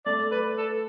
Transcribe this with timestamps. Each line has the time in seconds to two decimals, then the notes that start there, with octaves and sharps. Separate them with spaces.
0.06 A3 D5
0.31 B4
0.58 A4